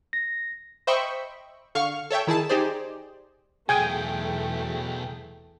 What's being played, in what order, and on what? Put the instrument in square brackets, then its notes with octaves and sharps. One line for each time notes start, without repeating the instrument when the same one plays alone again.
[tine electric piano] A#6
[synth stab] C5 D#5 E5 G5 B5 C#6
D3 F5 C#6 F6
A4 C#5 E5 G5
D#3 E4 G#4 A5
D#4 G4 G#4 C5 D5
[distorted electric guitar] B1 [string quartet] E2 A3 [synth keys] G#4 G5 [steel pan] G#5